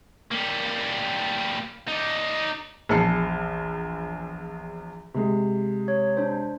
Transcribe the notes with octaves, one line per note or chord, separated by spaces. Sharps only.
G3 A#3
D#4 D5
A#1 E2 A5 C7 C#7
C3 G#3
C#5
D4 C5